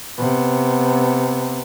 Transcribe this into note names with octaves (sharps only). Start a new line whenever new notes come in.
C3 B3